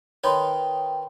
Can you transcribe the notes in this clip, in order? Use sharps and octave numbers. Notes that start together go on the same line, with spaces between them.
D#3 D#4 B4 C#5 G5 C6